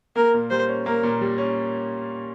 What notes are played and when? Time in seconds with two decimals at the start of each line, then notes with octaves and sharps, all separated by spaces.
0.16 A#3 A#4
0.34 A#2
0.51 G3 C5
0.68 C#4
0.86 A#3 A#4
1.03 A#2
1.21 G3
1.38 C#4